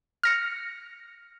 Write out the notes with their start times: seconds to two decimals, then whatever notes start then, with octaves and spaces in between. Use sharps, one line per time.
0.23 F6 A#6 C#7